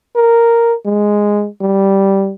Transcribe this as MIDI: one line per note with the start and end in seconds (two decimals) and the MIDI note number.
0.16 0.75 70
0.85 1.47 56
1.61 2.33 55